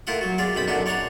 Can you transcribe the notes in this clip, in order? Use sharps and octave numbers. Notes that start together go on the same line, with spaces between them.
A2 A#3 E4 F4 F#5 D#6
F#3 F#4
B3 F4 G#4 D5
B1 F#2 C4 B5 D#6
F#2 A#2 D3 B3 D4 D#4
C#5 D5 F#5 G#5 A#5 C6